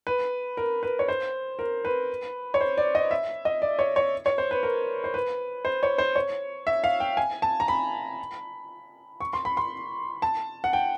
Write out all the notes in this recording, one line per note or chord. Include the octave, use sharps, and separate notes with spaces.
B4
A#4
B4
C#5
C5
A#4
B4
C#5
C5
D5
D#5
E5
D#5
D5
C#5
C#5
C#5
C5
B4
A#4
C5
B4
C5
C#5
C5
C#5
E5
F5
G5
G#5
A5
A#5
B5
C#6
C6
B5
C6
A5
F#5
G5